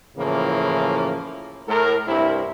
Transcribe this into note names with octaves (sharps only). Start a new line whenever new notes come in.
A2 C#3 E3 F3 A#3
A2 A#4
C2 G2 C4 E4